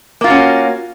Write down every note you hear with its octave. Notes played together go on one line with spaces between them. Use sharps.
A#3 C#4 F4 F#4